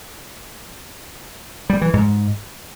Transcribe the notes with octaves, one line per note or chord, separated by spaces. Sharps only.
G3
E3
G#2